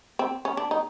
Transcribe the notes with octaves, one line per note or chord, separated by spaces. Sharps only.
C4
C#4
D4
D#4